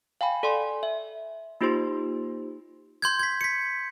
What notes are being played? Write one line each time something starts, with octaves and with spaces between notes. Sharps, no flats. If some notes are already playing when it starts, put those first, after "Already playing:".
F5 G5 G#5 B5
A4 D5 G#5 C6
E5
A#3 D#4 F4 G4 C5 C6
C6 G6 G#6
G#6 B6
B6 C#7